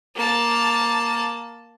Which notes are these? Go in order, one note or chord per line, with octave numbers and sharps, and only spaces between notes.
A#3 A5